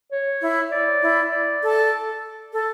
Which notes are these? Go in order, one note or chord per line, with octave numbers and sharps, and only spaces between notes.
C#5
E4
D5
E4
D5
A4
A4